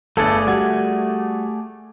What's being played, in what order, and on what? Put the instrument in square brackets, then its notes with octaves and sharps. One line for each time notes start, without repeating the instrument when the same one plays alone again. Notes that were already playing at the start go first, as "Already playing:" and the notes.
[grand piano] G1 A4 [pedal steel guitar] A3 G#4 D5
[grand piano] G3 F#4 G#6